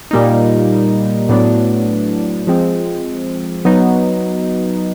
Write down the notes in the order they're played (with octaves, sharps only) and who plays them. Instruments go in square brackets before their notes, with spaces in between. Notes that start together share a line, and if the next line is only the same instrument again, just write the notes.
[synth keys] A#2 G3 A#3 D#4
A2 F#3 B3 D4
F3 G#3 C4
F#3 B3 D#4